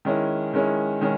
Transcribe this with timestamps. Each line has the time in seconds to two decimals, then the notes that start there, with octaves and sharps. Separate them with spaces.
0.05 D#3 G#3 C#4 E4
0.54 D#3 G#3 C#4 E4
1.01 D#3 G#3 C#4